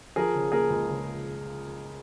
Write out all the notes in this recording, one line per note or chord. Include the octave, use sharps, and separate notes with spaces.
F3 G#4 A#4
C#3
A#3 G#4 A#4
C#2
C#3